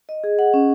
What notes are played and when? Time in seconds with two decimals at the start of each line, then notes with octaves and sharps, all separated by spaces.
0.09 D#5
0.24 G#4
0.39 F#5
0.54 C#4